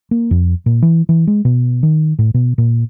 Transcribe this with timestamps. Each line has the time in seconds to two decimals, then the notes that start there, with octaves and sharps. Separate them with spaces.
0.11 A#3
0.31 F2
0.66 A#2
0.82 E3
1.09 E3
1.27 G#3
1.45 B2
1.83 D#3
2.19 A2
2.34 B2
2.58 A#2